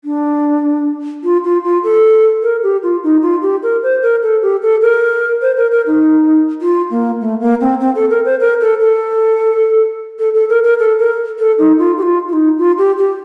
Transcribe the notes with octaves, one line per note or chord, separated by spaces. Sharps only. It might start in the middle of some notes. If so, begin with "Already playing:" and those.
D4
F4
F4
F4
A4
A#4
G4
F4
D#4
F4
G4
A#4
C5
A#4
A4
G4
A4
A#4
C5
A#4
A#4
D#4
F4
A#3
A3
A#3
C4
C4
A4
A#4
C5
A#4
A4
A4
A4
A4
A#4
A#4
A4
A#4
A4
D#4
F4
G4
F4
F4
D#4
F4
G4
G4